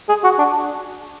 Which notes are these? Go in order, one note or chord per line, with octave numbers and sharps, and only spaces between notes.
G#4
F#4
D4